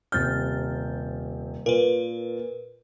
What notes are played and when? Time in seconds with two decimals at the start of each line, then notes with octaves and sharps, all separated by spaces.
0.12 D#1 C3 F6 G6 A6
1.66 A#2 A#4 B4